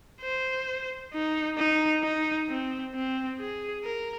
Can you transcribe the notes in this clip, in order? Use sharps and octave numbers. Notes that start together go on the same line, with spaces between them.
C5
D#4
D#4
D#4
C4
C4
G#4
A#4